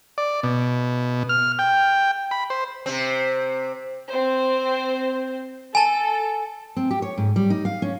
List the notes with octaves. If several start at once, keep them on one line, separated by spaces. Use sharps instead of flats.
D5
B2
F6
G5
B5
C5
C3 C4
C4 C5
A4 G#5 A5
C4
G4
C#5
G#2
G3
D#4
F5
C#4